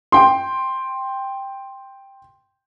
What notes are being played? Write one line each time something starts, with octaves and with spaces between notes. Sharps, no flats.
G5 C6